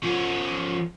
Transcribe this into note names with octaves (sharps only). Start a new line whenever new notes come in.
F3 C#4